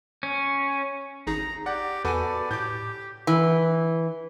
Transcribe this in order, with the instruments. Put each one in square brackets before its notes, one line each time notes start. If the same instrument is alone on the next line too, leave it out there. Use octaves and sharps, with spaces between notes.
[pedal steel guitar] C#4
[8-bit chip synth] G#1 D#4 G#4 [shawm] A#5
[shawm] G4 [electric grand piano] D5 F#5
[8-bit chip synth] E2 G#5 [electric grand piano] F#4 A4 B4 [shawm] D5
[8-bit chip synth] A2 [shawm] G4 [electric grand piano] D6 G6
[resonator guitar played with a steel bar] E3